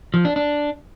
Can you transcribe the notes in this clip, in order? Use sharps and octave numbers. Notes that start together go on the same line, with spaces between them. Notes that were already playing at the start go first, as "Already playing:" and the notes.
F3
D4
D4